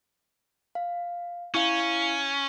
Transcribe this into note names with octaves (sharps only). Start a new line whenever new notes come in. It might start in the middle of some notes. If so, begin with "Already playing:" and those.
F5
C#4 E4 F5